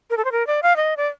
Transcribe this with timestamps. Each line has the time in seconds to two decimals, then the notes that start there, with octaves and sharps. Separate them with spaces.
0.10 A#4
0.17 A4
0.25 C5
0.32 A#4
0.47 D5
0.63 F5
0.76 D#5
0.97 D5